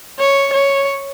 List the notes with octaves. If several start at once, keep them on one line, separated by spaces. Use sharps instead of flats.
C#5
C#5